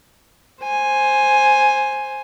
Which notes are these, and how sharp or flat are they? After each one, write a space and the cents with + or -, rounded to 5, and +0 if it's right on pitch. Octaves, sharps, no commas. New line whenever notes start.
C5 +10 G#5 +0